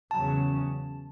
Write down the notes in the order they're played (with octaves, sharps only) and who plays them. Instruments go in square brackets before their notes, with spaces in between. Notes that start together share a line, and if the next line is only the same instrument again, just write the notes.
[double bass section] E2 C#3 F#3 C#4 [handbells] A5